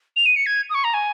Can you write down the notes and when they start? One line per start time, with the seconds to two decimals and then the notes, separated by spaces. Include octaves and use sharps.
0.16 F7
0.26 D#7
0.36 C#7
0.46 G#6
0.69 D#6
0.74 C#6
0.84 A#5
0.94 G#5